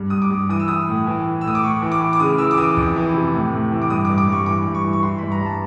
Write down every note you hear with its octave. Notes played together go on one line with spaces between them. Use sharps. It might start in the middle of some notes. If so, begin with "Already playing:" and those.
Already playing: G2
G2 D#6
D6
G2
E3 D#6
E6
E3 D#6
A2
E3
E3
E6
A2 D#6
D6
A2 C#6
E3
D6
E3
D6
C#3 D#6
E3 E6
D6
E3 D#6
F2
E3
C3
A2
A2
E3
D6
G2 D#6
D6
G2
D6
G2 C#6
E3 D6
G2
C#6
E3
C#6
E3 C6
B5
G2
A#5
G2 A5